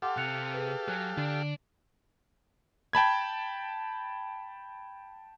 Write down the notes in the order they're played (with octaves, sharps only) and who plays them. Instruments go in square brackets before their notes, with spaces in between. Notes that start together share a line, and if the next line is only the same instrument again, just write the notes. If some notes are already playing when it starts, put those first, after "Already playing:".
[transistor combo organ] G4 A4 F5 [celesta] F#5 C6 D6
[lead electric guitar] C3 [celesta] F#6 C#7 F7
[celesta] G#4 B4
[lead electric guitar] F#3 [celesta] G#5 F#6
[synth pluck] D3 [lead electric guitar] D4 D5
[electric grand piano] G5 A5 B5 G#6